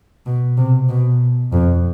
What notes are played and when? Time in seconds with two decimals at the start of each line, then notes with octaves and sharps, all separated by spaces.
0.26 B2
0.58 C3
0.89 B2
1.52 F2